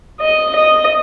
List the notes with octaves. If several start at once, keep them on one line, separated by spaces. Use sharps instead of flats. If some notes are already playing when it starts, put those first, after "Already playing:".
D#5
D#5